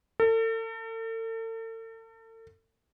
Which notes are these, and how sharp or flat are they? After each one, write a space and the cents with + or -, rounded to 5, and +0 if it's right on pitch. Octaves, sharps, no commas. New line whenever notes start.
A4 +40